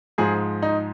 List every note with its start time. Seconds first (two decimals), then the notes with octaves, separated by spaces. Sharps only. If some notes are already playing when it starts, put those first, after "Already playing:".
0.18 G#2 F3 G#3 G#4
0.62 D#4